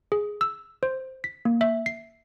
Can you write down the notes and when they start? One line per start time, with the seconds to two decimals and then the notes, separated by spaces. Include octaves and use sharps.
0.12 G#4
0.41 E6
0.83 C5
1.24 B6
1.45 A#3
1.61 E5
1.86 C7